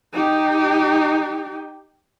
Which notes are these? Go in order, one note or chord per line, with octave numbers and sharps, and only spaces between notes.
D#4 G4